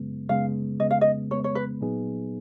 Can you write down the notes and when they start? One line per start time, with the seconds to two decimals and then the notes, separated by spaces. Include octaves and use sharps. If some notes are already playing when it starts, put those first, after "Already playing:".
Already playing: F#2 C#3 G#3 B3
0.28 F#2 C#3 G#3 B3 F5
0.80 F2 C#3 G#3 B3 D#5
0.91 F5
1.01 D#5
1.30 F2 C#3 G#3 B3 C#5
1.44 C#5
1.55 B4
1.81 A#2 F#3 B3 D#4 G#4